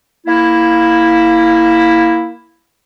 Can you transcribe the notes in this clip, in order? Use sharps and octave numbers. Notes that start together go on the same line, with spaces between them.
A#3 E4